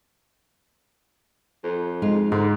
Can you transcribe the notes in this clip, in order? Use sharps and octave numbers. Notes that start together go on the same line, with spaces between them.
F2
G#3 D#4 F4
G#2 D3